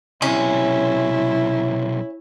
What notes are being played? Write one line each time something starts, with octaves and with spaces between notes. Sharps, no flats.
B1 C3 C#4 E4